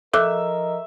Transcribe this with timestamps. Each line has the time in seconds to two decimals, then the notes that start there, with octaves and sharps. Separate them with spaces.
0.13 F3 A4 A#4 D#5 E5 D6 F#6